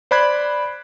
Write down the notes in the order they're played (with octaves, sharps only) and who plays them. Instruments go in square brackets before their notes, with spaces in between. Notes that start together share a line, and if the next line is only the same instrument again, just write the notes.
[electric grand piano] C5 D5 B5 F#6 G#6